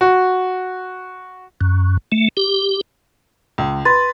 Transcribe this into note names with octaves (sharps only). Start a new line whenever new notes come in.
F#4
F#2
A3
G4
C#2
B4 C6 A6